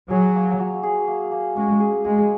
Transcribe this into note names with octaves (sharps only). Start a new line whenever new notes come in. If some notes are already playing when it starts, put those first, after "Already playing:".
F#3 G#4
A#3
F#3
G#4
A#3
A#3
G#3 C#4
G#4
G#3 G#4